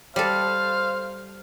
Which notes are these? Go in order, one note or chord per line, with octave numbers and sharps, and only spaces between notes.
G3 A4 C5 F5